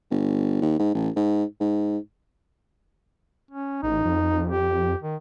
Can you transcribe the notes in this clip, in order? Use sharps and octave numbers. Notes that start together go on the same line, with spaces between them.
G1
D#2
G#2
A1
G#2
G#2
C#4
A1 D#4
F2
G4
D#3